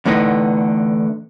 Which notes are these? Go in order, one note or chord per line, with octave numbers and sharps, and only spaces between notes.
E2 A2 D3 B3 D#4